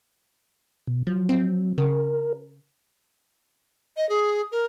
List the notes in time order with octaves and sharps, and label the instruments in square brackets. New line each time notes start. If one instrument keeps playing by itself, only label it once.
[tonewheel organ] B2
[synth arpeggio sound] F3 [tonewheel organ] F#3
[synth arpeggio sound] C4
[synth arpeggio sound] C#3 [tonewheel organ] A#4
[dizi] D#5
G#4
A#4